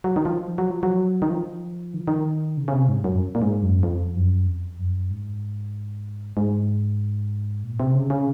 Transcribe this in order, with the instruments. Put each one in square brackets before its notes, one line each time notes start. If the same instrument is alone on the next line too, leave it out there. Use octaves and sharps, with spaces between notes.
[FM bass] F#3
D#3
F3
F#3
F3
F#3
D#3
F3
D#3
F3
D#3
C#3
C#3
C3
G#2
F#2
A#2
G#2
F#2
F2
F#2
F2
F#2
G#2
G#2
A#2
C3
C#3
C#3